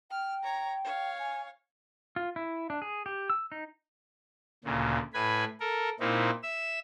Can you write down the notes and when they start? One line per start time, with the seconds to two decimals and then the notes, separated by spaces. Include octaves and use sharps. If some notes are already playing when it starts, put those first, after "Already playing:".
0.11 G5 F6
0.43 C#5 A#5
0.84 C#5 F5
1.19 G#5
2.16 F4
2.36 E4
2.70 D4
2.82 G#4
3.06 G4
3.30 E6
3.52 D#4
4.64 D2 A#2 C#3
5.14 A2 B4 G#5 B5
5.60 A4 A#4
6.00 A#2 A#3 C4 D#4 E4
6.43 E5 E6